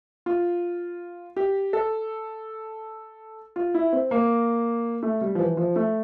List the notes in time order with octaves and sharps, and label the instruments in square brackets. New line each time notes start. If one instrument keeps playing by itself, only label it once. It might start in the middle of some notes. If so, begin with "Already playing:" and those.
[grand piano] F4
G4
A4
F4
E4
C4
A#3
A3
G3
F3
E3
F3
A3